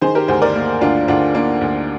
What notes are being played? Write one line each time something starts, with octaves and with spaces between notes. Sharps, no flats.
D#3 G#4 C5
G4 A#4
D2 G#4 C5
A#4 D5
A#3
D2 D4 F4
D2 D4 F4
A#3 D4
D2